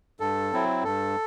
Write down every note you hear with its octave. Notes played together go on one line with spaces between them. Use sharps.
G2 A4
F#3 C4 E4
G2 A4